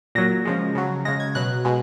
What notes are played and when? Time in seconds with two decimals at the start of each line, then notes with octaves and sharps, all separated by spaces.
0.15 A#2 F#3 A#6
0.45 C#3 F3 G#3
0.75 C#3 F#3
1.05 C#3 G#3 A#6
1.20 G#6
1.35 B2 F#3 F#6
1.65 B2 G#3